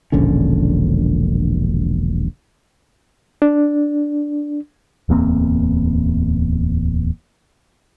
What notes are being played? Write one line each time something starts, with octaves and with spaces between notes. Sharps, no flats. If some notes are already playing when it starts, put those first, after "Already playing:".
E1 A#1 D3 C#4
D4
D1 E2 A#3 C4